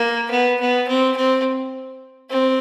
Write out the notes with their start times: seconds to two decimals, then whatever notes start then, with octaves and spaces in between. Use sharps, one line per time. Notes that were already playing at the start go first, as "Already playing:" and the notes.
Already playing: A#3
0.31 B3
0.60 B3
0.88 C4
1.17 C4
2.30 C4